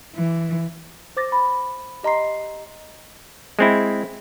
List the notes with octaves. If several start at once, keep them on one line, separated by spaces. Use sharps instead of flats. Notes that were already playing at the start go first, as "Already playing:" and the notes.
E3
C5 D6 A6 A#6
B5
G4 D#5 A#5 C6 C7
G#3 C4 E4